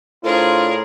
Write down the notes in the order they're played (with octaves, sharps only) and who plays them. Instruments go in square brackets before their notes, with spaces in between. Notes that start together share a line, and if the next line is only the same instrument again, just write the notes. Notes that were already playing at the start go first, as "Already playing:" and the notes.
[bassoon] A2 [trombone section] D4 C5 [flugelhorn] F4 [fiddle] G#4 A#4